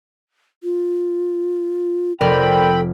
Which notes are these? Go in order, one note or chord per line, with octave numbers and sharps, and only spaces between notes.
F4
F1 C4 A4 A#4 D5 G5 B5 F6